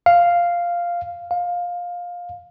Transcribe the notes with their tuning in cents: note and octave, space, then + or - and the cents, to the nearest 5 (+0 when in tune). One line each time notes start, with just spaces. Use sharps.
F5 -5
F5 +15